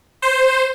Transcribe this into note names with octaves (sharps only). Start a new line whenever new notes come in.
C5